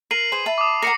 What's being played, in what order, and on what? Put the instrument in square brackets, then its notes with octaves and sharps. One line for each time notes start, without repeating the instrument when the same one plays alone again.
[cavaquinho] A#4 [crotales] C7 D#7 F#7
[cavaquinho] G#4 B4 C5
E5 A5 B5
[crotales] D6 D#6
[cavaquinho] A#4 F#5 A#5 [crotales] A#6 C#7